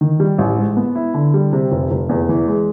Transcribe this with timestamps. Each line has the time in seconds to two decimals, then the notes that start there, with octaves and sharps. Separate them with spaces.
0.01 D#3
0.20 G3
0.38 A1
0.58 G#2
0.77 B3
0.95 E4
1.14 D3
1.34 G3
1.53 C3
1.72 F1
1.91 F1
2.09 E2
2.29 E3
2.48 G#3